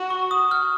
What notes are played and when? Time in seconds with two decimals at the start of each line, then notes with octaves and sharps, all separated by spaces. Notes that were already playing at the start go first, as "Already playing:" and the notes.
Already playing: F#4
0.10 C#6
0.31 D#6
0.51 F6